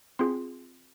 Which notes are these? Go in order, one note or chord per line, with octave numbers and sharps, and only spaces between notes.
C4 F4 G#4 C6